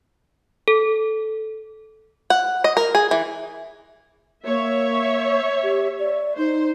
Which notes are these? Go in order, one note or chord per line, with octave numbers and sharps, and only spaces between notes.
A4
F#5
D#5
A#4
G#4
E3
A#3 C#5 E5
G4
D5
D#4 C5